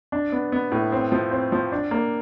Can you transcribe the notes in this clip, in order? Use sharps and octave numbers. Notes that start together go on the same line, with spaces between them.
D4
B3
B3
A2
C4
F3
C4
F3
D4
A#3